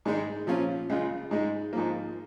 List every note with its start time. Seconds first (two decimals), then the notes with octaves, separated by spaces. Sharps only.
0.05 G#2 D#3 G#3 D#4
0.47 A#2 F3 C#4 F4
0.90 C#2 C#3 G#3 F4
1.31 G#2 G#3 D#4
1.73 G#2 F3 A#3